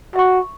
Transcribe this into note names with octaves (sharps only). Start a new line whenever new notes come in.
F#4 E5 C#6